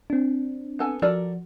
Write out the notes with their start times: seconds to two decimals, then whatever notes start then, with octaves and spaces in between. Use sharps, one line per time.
0.10 C4 D4
0.79 B3 A4 G#5
1.02 F3 F#4 A4 A#4 D5